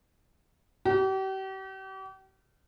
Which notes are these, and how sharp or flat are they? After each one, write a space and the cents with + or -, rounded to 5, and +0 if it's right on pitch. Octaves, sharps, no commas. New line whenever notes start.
G4 -40